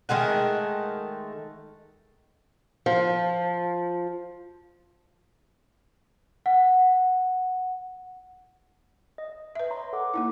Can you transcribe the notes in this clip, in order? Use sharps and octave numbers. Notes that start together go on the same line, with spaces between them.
D#3 G#3 A3 F#5
F3
F#5
D#5
B4 E5
C#5 A#5 C6
A4 F#5 D6
A#3 D#4 E4